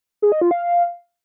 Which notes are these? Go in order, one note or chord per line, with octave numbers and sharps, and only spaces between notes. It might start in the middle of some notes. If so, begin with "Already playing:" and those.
G#4
D#5
F4
F5